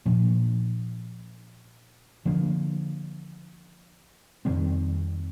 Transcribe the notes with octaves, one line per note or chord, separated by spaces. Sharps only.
A#2 F3 A#3 D4
D3 F3 A#3 D4
F2 D#3 G3 C4